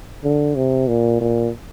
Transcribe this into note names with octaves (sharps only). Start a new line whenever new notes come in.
D3
C3
A#2
A#2